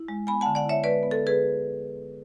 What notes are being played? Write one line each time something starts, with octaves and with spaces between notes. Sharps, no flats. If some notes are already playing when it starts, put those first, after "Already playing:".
Already playing: E4
G#3
B3 G#5 B5
D3 F#5 A5
D5 F#5
E4 C#5 E5
G#3 B4 D5
B3
A4
D3
G#4 B4